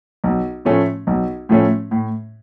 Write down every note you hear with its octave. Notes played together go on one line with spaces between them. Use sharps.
B1
A2 F3 A3 C#4
B1
A2 F3 A3 C#4
A2